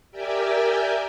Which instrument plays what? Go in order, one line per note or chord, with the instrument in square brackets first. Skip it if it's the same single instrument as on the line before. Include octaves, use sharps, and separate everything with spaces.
[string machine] G4 A#4 D5 E5 G5 G#5